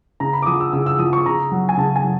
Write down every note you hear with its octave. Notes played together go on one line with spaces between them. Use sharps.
C#3 A#5
B5
D6
F3 D#6
E6
C#3 E6
E6
F3 D#6
C#6
C#3 A#5
F#3
G#5
C#3 A5
G#5
F#3